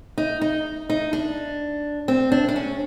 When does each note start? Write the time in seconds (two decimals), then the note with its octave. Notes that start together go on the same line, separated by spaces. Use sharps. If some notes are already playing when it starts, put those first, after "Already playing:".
0.18 D#4
0.41 D#4
0.90 D#4
1.13 D4
2.08 C4
2.32 D4
2.49 D4
2.56 C#4